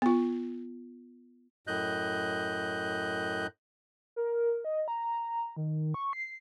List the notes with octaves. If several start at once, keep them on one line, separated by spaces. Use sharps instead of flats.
B3 F4
F#2 A2 D#5 F#6 G6
A#4
D#5
A#5
D#3
C#6
C7